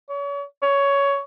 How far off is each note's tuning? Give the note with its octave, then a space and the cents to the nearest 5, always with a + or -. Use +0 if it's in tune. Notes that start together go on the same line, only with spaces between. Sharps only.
C#5 +35
C#5 +15